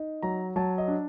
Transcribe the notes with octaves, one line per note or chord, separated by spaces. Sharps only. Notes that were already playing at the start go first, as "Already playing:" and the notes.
Already playing: D#4
F#3 A#5
F#3 A5
D#5
D4